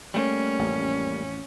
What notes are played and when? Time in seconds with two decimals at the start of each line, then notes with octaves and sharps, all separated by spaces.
0.14 G3 A3 A#3 C#4
0.59 A1 F2